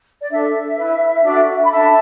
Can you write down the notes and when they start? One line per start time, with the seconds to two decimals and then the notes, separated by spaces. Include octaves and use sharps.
0.21 D5
0.30 D4 A4 E5
0.77 E4 B4
1.23 D4 F#4 A4
1.64 B5
1.70 D4 A4 E5 A5